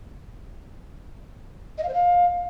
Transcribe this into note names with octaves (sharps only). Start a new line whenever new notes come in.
D#5
F5
C5
F5